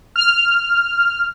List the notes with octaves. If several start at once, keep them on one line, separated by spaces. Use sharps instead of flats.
F6